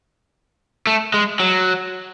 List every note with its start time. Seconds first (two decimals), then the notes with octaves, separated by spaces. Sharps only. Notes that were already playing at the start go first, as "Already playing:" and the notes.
0.87 A3
1.14 G#3
1.40 F#3